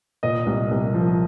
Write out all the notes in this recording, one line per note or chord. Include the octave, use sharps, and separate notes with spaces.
A#2 D#5
C2
C2
F3